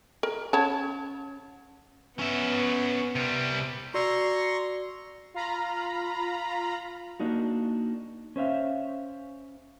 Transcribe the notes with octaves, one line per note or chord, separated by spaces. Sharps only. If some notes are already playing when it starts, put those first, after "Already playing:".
A#4
C#4 C#5 A5
B3 C#4 E5
C3 G3
F#4 D5 A#5 C6 C#6 E6
F4 F5 A#5 B5
A#3 D4 D#4 F#4
C#4 C5 E5 F5